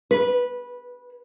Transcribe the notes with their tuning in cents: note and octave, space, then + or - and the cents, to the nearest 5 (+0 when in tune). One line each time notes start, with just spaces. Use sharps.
B4 -15